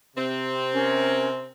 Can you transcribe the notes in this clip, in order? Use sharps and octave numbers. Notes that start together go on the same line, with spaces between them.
C3 C4
C#4 A#4